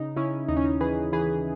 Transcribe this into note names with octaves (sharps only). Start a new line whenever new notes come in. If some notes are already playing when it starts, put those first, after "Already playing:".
Already playing: C#3 D#4
C#3 C#4 E4
D#2 D#4
C#4
D#4
E3 G#4 B4
E3 G#4 B4